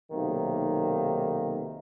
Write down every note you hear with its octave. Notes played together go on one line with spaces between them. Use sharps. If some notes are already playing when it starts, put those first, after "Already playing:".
B1 C3 D#3 A#3